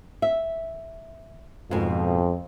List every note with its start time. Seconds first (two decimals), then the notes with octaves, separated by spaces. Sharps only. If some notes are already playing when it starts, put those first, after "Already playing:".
0.22 E5
1.71 F2 G#2 B2